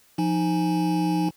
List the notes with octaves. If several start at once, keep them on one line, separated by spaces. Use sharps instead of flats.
F3 D#4 G#5